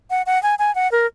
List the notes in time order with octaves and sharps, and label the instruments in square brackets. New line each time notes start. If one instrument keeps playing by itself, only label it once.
[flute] F#5
F#5
G#5
G#5
F#5
A#4